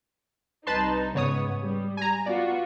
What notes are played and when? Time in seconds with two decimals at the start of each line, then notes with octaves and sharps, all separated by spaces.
0.67 C2 D#4 B4 A5 C6
1.15 G#2 C#3 B3 C#5 D#6
1.63 G3
1.97 G#5 A#5
2.26 B3 F4 F#4 D5